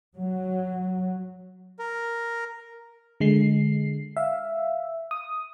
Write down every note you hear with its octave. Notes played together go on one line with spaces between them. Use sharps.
F#3
A#4
D3 G#3 C7
E5 F5
D#6